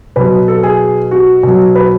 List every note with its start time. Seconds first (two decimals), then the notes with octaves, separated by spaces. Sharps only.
0.16 B2 F#3 B4
0.48 A4
0.63 G#4
1.11 F#4
1.43 B2 F#3
1.75 B4